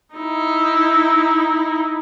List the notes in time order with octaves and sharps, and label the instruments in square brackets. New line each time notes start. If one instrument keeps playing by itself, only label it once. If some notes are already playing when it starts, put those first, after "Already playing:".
[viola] D#4 E4